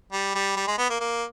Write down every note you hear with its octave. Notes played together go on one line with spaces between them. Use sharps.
G3
G3
G3
G#3
B3
A#3
A#3